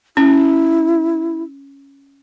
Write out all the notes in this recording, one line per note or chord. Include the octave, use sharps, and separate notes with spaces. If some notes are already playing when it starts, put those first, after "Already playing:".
C#4 E4